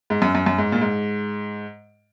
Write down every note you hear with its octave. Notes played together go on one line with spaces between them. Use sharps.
G#2
F#2
F#2
F#2
G#2
A#2
G#2